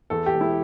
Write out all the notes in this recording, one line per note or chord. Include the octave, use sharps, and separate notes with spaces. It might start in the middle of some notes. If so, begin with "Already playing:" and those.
E2 A4
G4
E1
E4